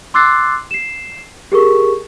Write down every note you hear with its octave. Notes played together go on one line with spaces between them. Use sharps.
C6 D6 E6 F#6 A6 C7
C7 E7
G4 G#4 A#4 C#6